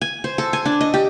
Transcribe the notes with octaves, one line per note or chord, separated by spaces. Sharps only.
G#5
C5
A4
G#5
D4
D#5
G4